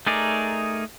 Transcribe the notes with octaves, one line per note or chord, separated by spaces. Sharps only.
A3 D#4 G#4 A#4 D5